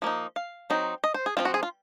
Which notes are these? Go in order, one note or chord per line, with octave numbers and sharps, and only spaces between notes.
F3 A#3 D#4
F5
F#3 C4 D#4
D#5
C5
G#4
F3 G#3 C4 F4
F#4
G#4
F4